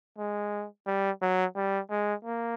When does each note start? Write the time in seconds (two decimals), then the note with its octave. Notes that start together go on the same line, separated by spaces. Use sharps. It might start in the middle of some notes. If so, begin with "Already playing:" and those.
0.18 G#3
0.87 G3
1.21 F#3
1.56 G3
1.90 G#3
2.25 A#3